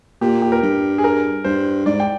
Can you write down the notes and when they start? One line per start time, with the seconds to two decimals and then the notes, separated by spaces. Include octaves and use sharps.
0.21 A#2 G4
0.42 G4
0.52 A#4
0.62 G2
0.98 G#4
1.04 A#4
1.44 G2 C5
1.86 G#2 D5
2.00 G5